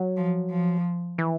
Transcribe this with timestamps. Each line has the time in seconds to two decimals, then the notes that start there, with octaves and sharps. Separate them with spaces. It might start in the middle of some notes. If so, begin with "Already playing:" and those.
Already playing: F#3
0.17 F3
0.50 F3
1.18 E3